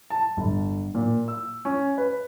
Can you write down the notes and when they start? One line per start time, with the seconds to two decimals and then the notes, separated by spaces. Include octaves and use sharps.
0.10 A5
0.37 G1
0.95 A#2
1.28 E6
1.65 C#4
1.98 B4